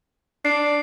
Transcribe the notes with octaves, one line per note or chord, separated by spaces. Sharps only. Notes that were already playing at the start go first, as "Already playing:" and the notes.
D4 C7